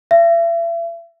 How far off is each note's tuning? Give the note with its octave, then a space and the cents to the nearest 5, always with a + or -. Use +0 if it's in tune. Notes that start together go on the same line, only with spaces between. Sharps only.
E5 +40